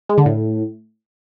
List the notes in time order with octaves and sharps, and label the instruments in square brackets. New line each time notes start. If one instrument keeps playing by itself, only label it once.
[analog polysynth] G#3
D3
A2